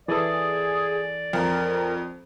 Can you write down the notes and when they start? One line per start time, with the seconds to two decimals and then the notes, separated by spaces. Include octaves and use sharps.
0.08 E3 G#4 A4 D5
1.33 F2 A#4